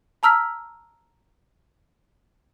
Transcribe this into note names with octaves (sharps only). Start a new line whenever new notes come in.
A5 A#5 E6 F6 B6